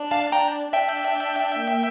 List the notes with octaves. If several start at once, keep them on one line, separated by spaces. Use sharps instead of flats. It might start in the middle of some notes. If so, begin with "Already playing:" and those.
Already playing: D4
F5 A5
D4 G5 A#5
D4 E5 G5
A#3